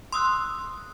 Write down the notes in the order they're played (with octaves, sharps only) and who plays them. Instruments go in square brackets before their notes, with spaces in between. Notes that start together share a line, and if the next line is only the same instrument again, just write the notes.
[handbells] C6 D#6 E6 F#6